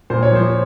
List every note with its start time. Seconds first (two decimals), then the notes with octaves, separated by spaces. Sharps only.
0.10 A#2 C5
0.22 C#5
0.31 F3 C5